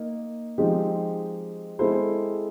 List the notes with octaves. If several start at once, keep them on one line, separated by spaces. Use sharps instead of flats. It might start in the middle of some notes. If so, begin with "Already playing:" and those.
Already playing: A#3 D#4
F3 G#3 C4 D#4 G4
G#3 C4 E4 A4 C5